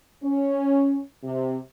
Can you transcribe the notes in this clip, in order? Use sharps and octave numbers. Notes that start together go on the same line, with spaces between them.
C#4
C3